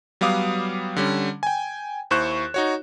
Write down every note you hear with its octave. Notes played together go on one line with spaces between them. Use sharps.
F#3 G3 B3 F5 D6 D#6
D3 G3 C#4
G5 G#5
D#2 E4 C5 C#6 F#6 E7
D#4 F#4 C#5